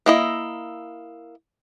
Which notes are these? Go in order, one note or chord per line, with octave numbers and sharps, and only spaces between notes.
A#3 E4 D#5